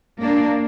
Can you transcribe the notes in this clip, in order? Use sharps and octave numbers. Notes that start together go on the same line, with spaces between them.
A#3 D4